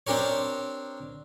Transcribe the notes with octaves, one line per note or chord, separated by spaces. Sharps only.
C4 D4 G4 A#4 C#5